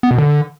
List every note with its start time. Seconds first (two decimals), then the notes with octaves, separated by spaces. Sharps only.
0.03 B3
0.11 B2
0.18 D3